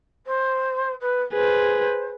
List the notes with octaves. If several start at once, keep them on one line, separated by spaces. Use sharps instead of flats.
C5
B4
G#4 B4 C5